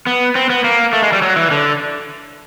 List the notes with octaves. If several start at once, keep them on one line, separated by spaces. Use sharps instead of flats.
B3
C4
B3
A#3
A3
G#3
G3
F#3
E3
D3